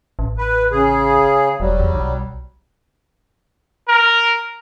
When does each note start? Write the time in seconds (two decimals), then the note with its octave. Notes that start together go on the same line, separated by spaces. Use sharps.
0.19 A1
0.38 B4
0.71 C#3 G#4
1.60 E1 F#3 G3
1.80 E2
1.95 B1
3.89 A#4